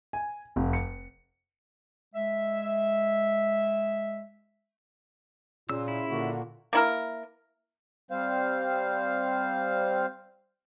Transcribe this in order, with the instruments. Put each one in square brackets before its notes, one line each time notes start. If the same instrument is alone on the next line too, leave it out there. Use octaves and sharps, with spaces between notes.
[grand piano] G#5
F1
C#7
[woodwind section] G#3 E5
[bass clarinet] A#2 [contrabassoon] C#3 [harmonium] F4 [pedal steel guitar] E6
[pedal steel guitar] E4
[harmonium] A#2 A#3 F#4 [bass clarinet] D3
[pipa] A#3 E4 A#4
[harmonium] G3 C4 C5 F5